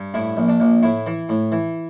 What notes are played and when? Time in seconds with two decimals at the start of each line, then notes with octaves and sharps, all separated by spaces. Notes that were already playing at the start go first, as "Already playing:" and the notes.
Already playing: G2
0.14 A2 E4
0.37 A#1
0.49 D4
0.60 A#1
0.83 A2 E4
1.07 E3
1.29 A2
1.52 E3